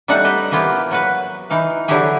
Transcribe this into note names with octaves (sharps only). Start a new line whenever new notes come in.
G3 A3 D4 D#4 F#5 A5
G4 B4 D#5 E5
E3 A#3 B3 F4 G4
F#3 F#4 B4
E3 D#4 F5
D3 F#3 E4 G4 G#4